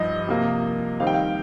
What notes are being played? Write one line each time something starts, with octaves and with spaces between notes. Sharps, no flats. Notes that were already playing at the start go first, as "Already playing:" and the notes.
Already playing: G2 F3 D#4 D#5
C3 F3 A#3 F4
D#3 G3 C4 D#4 F5
G5
F5